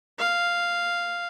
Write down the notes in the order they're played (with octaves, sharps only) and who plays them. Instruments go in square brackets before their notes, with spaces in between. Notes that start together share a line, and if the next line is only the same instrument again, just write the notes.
[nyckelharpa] F5